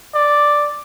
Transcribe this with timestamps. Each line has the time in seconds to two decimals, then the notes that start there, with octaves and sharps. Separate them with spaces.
0.15 D5